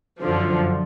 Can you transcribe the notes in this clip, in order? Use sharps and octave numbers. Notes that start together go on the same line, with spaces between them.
F#2 D3 F3